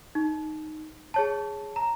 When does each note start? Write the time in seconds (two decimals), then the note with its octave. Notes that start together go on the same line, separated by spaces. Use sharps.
0.15 D#4
1.14 G#4 C#5 A5
1.76 A#5